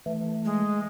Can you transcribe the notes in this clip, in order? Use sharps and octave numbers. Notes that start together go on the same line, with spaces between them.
E3 A3
G#3